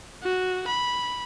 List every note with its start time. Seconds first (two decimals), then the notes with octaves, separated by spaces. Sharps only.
0.23 F#4
0.67 B5